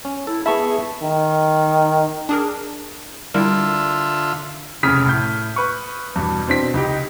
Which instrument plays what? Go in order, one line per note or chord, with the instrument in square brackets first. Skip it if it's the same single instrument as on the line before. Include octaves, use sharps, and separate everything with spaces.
[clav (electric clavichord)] C#4
[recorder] E4 [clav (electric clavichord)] A4
[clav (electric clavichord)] B3 E4 [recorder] G#4 [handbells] E5 A5 C#6
[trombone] D#3
[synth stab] D4 G#4 A#4
[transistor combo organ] D3 F4 E5 [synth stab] G3 E4 A#4
[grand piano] F1 C#3 D#6 F6 B6
A2 E4 G6
B4 C#6
E2 G2 B2
B2 C4 D4 B6
C#2 D#4 G4